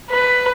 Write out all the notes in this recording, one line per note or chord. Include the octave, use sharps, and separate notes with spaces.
B4